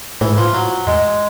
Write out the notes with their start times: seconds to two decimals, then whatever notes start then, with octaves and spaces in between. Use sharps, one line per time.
0.21 A2 E3
0.30 G#2
0.38 A2 F3
0.54 F#3
0.87 E2 G#3